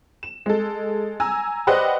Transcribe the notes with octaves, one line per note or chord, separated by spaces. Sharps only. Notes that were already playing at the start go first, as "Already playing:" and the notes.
E7
G#3 A4
G#5 A#5 E6
G4 B4 C5 D5 D#5 F#5